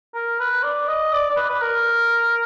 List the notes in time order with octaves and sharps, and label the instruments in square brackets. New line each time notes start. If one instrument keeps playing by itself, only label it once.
[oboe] A#4
B4
D5
D#5
D5
D5
B4
B4
A#4